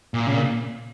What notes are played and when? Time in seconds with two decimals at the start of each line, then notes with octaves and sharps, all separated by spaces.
0.14 A#2
0.27 C#3
0.34 A#2